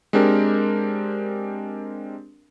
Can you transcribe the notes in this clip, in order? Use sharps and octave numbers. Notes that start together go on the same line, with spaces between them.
G#3 C4 D4 G4 A#4